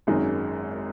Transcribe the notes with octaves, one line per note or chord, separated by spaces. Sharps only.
G#1 F#2 D#3 G#3 D#4